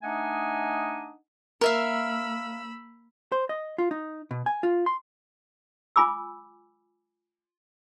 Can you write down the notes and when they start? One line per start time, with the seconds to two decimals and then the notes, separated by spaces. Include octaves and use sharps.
0.03 A3 D4 D#4 D#5 F#5 G#5
1.61 A#3 A#4 E5 F5 B5 E6
3.32 C5
3.49 D#5
3.78 F4
3.91 D#4
4.31 B2
4.46 G#5
4.63 F4
4.86 C6
5.96 F4 G#5 B5 D6 E6